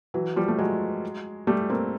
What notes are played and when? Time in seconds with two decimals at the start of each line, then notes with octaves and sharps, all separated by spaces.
0.14 E3 F#3
0.36 F3 G3
0.48 A3
0.58 F#3 G#3
1.47 G3 A3
1.70 A#3 C4